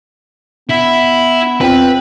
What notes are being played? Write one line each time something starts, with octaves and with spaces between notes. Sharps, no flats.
B3 E4
E2 C4 F4 B4 G5